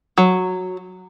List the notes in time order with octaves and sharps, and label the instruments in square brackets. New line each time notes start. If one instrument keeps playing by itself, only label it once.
[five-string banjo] F#3